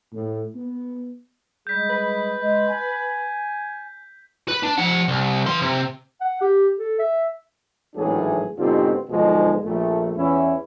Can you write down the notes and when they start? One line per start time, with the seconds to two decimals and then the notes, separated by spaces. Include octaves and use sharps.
0.13 A2
0.55 B3
1.67 G3 G#3 G#4 G6 B6
1.90 B4
2.39 G#3
2.69 G#5
4.48 B4
4.63 D4
4.78 F3 F#5
5.08 C2
5.46 E3 C6
5.62 C3
6.21 F#5
6.41 G4
6.78 A4
6.99 E5
7.96 G#1 A2 E3 F#3 D4 G#4
8.58 G#2 B2 D3 C4 F4 G4
9.10 B1 G#2 B2 D3 F3 G#3
9.64 A#1 A3
10.17 E2 C#4 E4